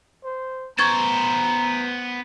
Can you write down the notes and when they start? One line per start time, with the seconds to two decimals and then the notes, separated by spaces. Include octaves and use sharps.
0.24 C5
0.78 B3 C5 A#5 C#6 G#6 A6